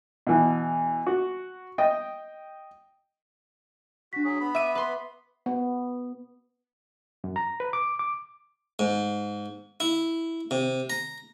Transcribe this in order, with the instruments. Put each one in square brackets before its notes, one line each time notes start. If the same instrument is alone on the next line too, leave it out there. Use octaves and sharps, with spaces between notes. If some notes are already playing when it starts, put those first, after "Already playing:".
[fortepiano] B2 E3
F#4
D#5 G5
[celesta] D4 B6 [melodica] F#4
[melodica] F#3 G#4
B3 B5
[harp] E5 D#7 [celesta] D6
[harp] B4 C6
[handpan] B3
[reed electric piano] F#2
A#5
B4
D6
D6
[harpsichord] G#2
E4
C3
A#5